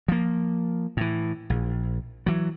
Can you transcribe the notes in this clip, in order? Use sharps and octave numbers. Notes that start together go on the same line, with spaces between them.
F3 A#3
A2 E3
A#1
E3 F#3